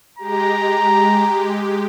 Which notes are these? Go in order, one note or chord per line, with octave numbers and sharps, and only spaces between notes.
G#3 G4 A#5